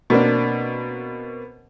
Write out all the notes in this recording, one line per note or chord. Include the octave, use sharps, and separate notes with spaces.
B2 A#3 C4 D4